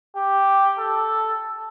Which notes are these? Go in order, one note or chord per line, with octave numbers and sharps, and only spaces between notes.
G4
A4